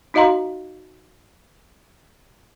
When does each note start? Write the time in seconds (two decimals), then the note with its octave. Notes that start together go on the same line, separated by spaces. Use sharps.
0.14 D#4 F#4 D#5 F5 A#5 C6